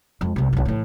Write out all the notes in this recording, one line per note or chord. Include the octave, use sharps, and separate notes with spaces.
F2 G#3
C2 C3
D1 B1
A2 E3